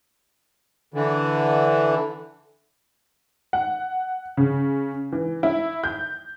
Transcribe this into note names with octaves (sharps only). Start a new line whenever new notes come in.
D3 E3
F#5
C#3
E3
E4
G6